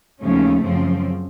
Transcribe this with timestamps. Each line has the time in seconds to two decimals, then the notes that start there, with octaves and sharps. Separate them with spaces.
0.22 D#2 C#3 F3 A3 C#4
0.63 F#2 C#3 F3 C4